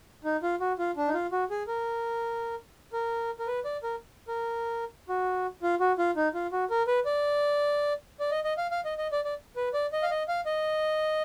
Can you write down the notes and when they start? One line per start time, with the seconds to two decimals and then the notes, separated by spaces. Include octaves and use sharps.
0.24 D#4
0.43 F4
0.60 F#4
0.79 F4
0.97 D4
1.08 D#4
1.14 F4
1.32 F#4
1.51 G#4
1.67 A#4
2.93 A#4
3.39 A#4
3.47 B4
3.65 D5
3.83 A#4
4.28 A#4
5.09 F#4
5.63 F4
5.80 F#4
5.98 F4
6.16 D#4
6.34 F4
6.52 F#4
6.70 A#4
6.87 B4
7.05 D5
8.20 D5
8.31 D#5
8.44 D#5
8.58 F5
8.71 F5
8.85 D#5
8.98 D#5
9.12 D5
9.25 D5
9.56 B4
9.74 D5
9.93 D#5
10.03 F5
10.11 D#5
10.28 F5
10.46 D#5